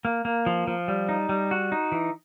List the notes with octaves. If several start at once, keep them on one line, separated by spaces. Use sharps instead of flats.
A#3
A#3
F3
F3
G3
D#4
G3
F#4
D#4
E3